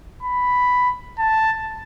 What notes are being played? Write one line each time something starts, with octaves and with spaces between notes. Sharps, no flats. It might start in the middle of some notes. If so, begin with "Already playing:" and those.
B5
A5